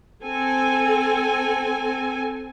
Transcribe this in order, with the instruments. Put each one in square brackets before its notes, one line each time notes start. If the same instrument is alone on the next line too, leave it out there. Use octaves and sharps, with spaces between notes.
[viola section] C4 A4 G#5